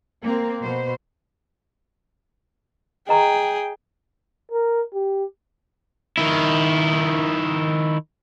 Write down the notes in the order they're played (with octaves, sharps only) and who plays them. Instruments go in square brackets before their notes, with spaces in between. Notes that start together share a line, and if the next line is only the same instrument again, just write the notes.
[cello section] A#3 C4
B2 C5
[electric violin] G#4 [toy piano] D#5 A#5 C#6 [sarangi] G5
[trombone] A#4
G4
[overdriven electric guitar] D#3 E4